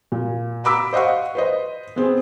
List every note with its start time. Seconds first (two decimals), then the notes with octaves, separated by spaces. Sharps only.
0.12 A#2
0.64 A#5 B5 D6 E6 B6
0.93 C5 D#5 F5 F#5 C#6
1.35 B4 C5 D#5
1.96 B3 C4 G#4